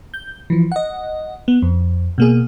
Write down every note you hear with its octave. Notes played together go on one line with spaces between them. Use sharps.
G6
E3 F3
D#5 F#5
B3
F2
B2 A#3 G#4